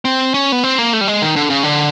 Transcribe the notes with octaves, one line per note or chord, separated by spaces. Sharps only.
C4
C#4
B3
C4
A#3
A3
G3
G#3
D#3
D3
C#3
D3